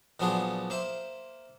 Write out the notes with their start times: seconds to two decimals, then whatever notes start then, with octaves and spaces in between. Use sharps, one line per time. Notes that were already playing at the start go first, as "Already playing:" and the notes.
0.20 A#2 F3 F#3 B3 D4 G#4
0.70 A#3 C5 E5